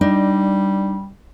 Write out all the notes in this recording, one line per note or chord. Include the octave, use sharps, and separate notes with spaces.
G3 D4 D#4